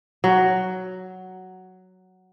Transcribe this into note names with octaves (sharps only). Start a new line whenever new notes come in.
F#3